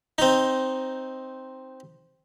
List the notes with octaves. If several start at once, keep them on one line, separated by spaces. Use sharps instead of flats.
C4 D#4